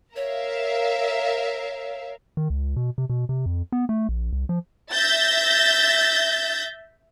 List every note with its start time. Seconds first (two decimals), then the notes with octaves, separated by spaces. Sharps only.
0.16 A#4 C#5 E5 F5
2.37 D#3
2.50 C#2
2.76 B2
2.98 C3
3.10 B2
3.29 C3
3.46 F2
3.72 B3
3.89 A3
4.09 A#1
4.33 C2
4.49 F3
4.93 E5 G6 A6 A#6